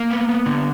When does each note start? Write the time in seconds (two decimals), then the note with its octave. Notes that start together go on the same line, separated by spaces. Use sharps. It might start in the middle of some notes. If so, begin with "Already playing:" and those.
Already playing: A#3
0.11 B3
0.29 B3
0.46 D3